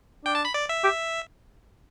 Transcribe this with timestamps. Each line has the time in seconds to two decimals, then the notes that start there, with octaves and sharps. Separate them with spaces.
0.25 D4 G5
0.35 A5
0.45 B5
0.54 D5
0.69 E5
0.84 G4